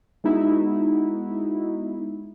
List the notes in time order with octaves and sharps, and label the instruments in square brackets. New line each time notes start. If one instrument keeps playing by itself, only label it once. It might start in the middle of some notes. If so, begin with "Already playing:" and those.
[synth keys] G#3 B3 D#4 E4 F#4